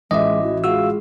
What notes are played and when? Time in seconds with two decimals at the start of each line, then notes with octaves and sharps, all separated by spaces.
0.11 A1 G#3 F4 D#5 E5 D6
0.42 E3 F#4
0.64 G#3 F4 F#4 G#4 F5 E6